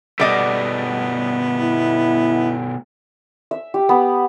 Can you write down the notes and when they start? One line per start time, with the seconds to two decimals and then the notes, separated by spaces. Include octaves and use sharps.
0.20 B2 G3 A3 B3 D5 D#5
1.60 E4
3.51 E5
3.74 G4
3.89 B3